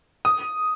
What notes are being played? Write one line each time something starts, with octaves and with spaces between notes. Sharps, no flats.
D#6